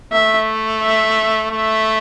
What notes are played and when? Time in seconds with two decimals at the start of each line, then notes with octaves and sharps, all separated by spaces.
0.12 A3 E5
0.82 E5
1.51 A3 E5